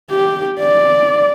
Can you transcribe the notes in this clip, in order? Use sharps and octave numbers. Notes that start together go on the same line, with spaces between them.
G4
D5